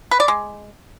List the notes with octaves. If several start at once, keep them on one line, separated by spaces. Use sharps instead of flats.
B4
D5
G#3